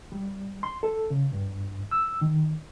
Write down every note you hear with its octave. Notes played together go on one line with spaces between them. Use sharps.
G3
C6
A4
C#3
G2
E6
D#3